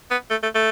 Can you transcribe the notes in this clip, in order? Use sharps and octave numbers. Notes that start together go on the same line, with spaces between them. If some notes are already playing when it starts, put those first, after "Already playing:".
B3
A3
A3
A3